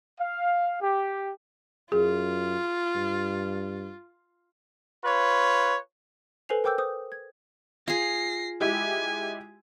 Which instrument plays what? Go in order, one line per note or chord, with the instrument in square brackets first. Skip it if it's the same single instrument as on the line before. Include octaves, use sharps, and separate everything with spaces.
[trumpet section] F5
G4
[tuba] F#2 [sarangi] F4 [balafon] G#4
[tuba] G2
[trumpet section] F4 B4 C#5
[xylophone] A4 B4 C5 G#5 C7 F7
A#4 C5 G5 D6 E6 G6
C5 D#6
G#6
[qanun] F4 G#4 [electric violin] A#6 C7
[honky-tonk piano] G#3 E4 G4 [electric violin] G#5